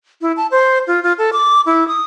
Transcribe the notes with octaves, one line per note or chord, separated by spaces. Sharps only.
E4
A5
C5
F4
F4
A4
D6
E4
D#6